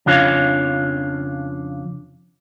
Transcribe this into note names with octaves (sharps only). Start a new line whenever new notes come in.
F2 C#3 D4 F4 C#5 F5